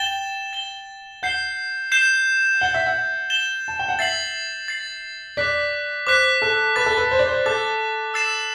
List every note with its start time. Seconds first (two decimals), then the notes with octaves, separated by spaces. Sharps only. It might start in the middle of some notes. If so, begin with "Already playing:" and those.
Already playing: G5 A6 E7 G7
0.53 A6 E7 G7
1.23 F#5 G6 C7 E7 G7
1.92 G6 C7 E7 G7
2.61 F#5 A6 E7 G7
2.74 E5
2.86 F#5
3.30 A6 E7 G7
3.68 A5
3.79 G5
3.88 F#5
3.99 E5 A6 C7 F#7
4.68 A6 C7 F#7
5.37 D5 D6 F#6 B6
6.07 C5 D6 F#6 B6
6.42 A4
6.76 B4 D6 F#6 A6
6.86 A4
6.97 B4
7.11 C5
7.19 D5
7.28 C5
7.46 A4 D6 F#6 A6
8.14 E6 A6 C7 E7